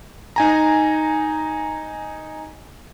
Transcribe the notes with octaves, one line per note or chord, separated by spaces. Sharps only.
D#4 G#5 A#5